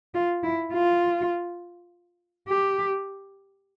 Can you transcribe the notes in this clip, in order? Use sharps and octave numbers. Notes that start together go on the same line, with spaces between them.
F4
E4
F4
G4